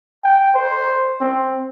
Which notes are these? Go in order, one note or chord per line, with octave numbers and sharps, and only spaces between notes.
G5
C5
C4